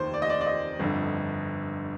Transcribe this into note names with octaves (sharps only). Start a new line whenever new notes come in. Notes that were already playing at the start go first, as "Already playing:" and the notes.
Already playing: F1 D#2 D#3 C5
D5
D#5
D5
D5
D#5
G1 F2 D3